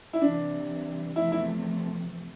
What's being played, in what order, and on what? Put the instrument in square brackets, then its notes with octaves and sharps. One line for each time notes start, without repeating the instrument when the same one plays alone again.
[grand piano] E4
[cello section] C3 E3 G3 [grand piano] D4
[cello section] E2 C3 F3 A3 [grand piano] E4
[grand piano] E4